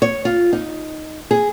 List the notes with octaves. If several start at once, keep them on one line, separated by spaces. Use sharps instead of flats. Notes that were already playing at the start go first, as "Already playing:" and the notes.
C#5
F4
D#4
G#4